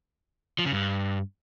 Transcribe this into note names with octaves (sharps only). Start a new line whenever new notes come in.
F3
C#3
G2